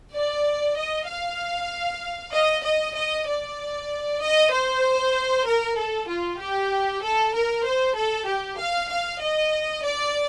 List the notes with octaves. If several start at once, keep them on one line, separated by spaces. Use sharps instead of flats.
D5
D#5
F5
D#5
D#5
D#5
D5
D#5
C5
A#4
A4
F4
G4
A4
A#4
C5
A4
G4
F5
F5
D#5
D5